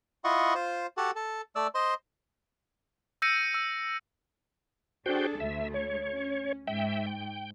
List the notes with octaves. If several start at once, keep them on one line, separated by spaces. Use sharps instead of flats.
E4 F4 D#5 F#5 C#6
F4 C5
F#4 G4 A4 F#5
A4
A3 D5 E6
C5 D#5 C6
E6 G6 A#6 C#7 D#7
E6
D4 F#4 G#4 A4 C5 G5
D2 A3 E5
C#5
C#4
G#2 E5 G5
G5